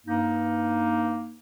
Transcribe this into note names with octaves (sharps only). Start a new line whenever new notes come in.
G2 A#3 D#4